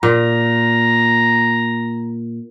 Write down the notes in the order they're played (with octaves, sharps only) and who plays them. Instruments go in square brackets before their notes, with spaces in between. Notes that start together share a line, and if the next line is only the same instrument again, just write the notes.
[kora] A#2 [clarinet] A#5